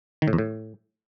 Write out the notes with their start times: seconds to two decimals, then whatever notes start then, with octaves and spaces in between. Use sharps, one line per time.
0.22 D#3
0.28 A2
0.33 E2
0.38 A2